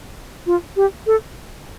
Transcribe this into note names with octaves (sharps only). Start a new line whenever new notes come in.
F4
G4
A4